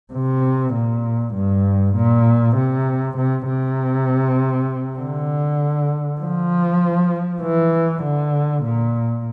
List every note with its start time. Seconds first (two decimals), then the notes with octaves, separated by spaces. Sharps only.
0.13 C3
0.74 A#2
1.34 G2
1.96 A#2
2.56 C3
3.17 C3
3.48 C3
4.99 D3
6.20 F3
7.42 E3
8.03 D3
8.64 A#2